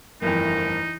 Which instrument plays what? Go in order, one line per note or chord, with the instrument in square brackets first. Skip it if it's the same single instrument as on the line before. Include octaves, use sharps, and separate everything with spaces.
[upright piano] G1 F2 [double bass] E3 [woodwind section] F3 A3 A#4 [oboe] D#4